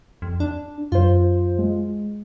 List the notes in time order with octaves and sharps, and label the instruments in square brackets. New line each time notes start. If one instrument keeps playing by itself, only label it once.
[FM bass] F2
D4
[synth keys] F#2 C5 [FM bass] F4
[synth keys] G#3